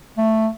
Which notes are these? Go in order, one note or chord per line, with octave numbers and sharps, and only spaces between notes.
A3